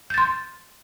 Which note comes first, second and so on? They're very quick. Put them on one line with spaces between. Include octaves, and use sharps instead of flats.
G6 A6 C6